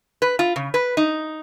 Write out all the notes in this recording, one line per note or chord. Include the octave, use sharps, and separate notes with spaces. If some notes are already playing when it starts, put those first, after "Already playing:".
B4
F4
C#3
B4
D#4